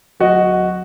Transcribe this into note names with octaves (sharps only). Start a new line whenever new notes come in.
D1 F#4 D#5